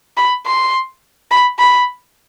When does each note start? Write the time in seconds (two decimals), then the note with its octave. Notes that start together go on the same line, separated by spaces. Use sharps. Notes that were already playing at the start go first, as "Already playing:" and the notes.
0.17 B5
0.46 C6
1.31 B5
1.59 B5